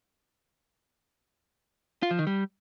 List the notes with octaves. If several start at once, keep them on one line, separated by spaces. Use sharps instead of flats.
F4
F3
D#3
G3